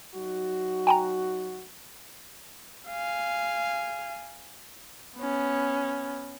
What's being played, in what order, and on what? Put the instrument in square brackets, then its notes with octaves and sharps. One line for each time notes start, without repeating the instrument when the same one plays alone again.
[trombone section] F#3 D#4 F#4
[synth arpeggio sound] G5 G#5 A#5
[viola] F5 G#5
B3 C#4